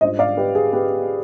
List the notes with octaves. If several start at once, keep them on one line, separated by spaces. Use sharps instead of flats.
G#2 G3 D4 F4 C5 D#5
D5 F5
G4 B4
G#4
G4 B4